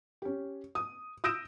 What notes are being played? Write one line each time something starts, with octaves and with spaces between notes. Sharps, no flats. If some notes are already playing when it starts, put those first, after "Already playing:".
C#4 G4
D#6
D#6 E6 G6 A#6 D7 E7